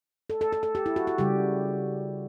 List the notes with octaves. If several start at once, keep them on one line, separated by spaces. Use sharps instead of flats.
A4
A4
A4
A4
G4
E4
F#4
F#4
C#3 G3 G4